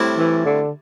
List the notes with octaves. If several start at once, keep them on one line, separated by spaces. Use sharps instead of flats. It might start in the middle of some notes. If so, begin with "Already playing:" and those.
Already playing: A2 G3 C4 E4
E3
D3